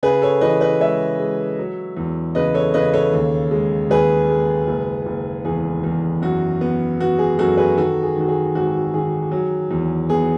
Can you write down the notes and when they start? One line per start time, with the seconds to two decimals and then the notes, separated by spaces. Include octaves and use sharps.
0.03 C#3 G#4 B4
0.22 A4 C#5
0.41 E3 B4 D#5
0.61 B4 D#5
0.80 G#3 C#5 E5
1.19 G#3
1.59 F#3
1.97 E2
2.35 C#3 B4 D#5
2.54 A4 C#5
2.74 C#3 B4 D#5
2.94 A4 C#5
3.13 D#2
3.51 G#3
3.90 D#2 G#4 B4
4.29 G#3
4.67 F#1
5.06 F#1
5.45 E2 G#4
5.84 E2
6.22 F#2 F#4
6.61 B3
7.00 B3 F#4
7.19 G#4
7.39 F#2 F#4 A4
7.57 G#4 B4
7.77 D#3 F#4 A4
8.03 G#4
8.16 D#3 F#4
8.28 G#4
8.55 G#1 F#4
8.94 D#3 G#4
9.31 F#3
9.71 E2
10.10 B3 G#4